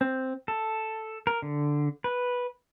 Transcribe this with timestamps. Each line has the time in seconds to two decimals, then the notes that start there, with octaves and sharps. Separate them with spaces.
0.01 C4
0.48 A4
1.27 A#4
1.42 D3
2.04 B4